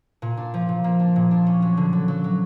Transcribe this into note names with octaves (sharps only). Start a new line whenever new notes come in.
A#2
D4
F3
A#2
A#3
D4
A#2
D4
C#4
F#3
D3
F#3
F#3
F#3